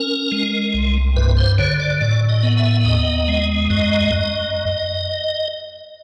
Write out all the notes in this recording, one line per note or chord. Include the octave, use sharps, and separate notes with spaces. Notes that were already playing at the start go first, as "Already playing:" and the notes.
Already playing: C#4 A#4
G#3
C2
G2 B4
C5
D3 C#5
D5
A2 D5
D#5
B3
E5
D#2 D#5
G#3
F#2 D#5
F#2